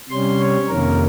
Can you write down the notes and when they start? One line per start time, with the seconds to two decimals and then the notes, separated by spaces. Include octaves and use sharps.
0.10 C3 G3 C#4 C6
0.39 C#5
0.69 F2 C3 D#3 A#3 C#4 A#4